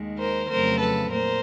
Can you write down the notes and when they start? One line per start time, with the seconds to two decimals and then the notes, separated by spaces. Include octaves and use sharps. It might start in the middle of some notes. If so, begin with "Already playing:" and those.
Already playing: D#2 D#3 G#3
0.18 A#4 C5
0.49 F2 C#3 F#3 A3 C4 A#4 C5
0.80 A4 B4
1.11 A#2 A#4 C5